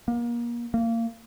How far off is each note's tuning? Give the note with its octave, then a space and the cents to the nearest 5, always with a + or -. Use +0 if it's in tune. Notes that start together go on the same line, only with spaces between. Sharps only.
A#3 +30
A#3 -25